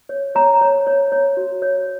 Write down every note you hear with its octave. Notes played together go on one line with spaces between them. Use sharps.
C#5
C#5 A#5
C#5
C#5
C#5
F#4
C#5